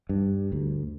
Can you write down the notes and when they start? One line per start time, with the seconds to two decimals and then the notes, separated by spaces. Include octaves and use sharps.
0.09 G2
0.52 D2